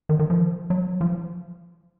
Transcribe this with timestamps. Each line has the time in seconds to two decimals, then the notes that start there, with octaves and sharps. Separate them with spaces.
0.09 D#3
0.19 D#3
0.30 F3
0.70 F#3
1.01 F3